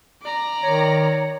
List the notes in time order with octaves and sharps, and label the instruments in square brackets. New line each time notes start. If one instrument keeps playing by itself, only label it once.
[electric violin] D5 A#5
[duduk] D#3 [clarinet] C#5